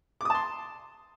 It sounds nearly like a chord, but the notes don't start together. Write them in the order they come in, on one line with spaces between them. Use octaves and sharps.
D6 D#6 A5 C6